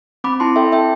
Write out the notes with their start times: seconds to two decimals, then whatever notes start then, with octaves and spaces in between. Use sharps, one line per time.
0.24 C4 B5 D6
0.40 E4 A5 C6
0.56 A4 E5 G5
0.72 C4 E5 G5